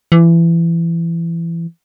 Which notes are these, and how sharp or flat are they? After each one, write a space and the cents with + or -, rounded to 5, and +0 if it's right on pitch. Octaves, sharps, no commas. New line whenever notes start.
E3 +25